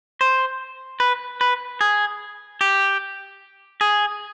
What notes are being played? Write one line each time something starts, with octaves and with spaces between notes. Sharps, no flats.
C5
B4
B4
G#4
G4
G#4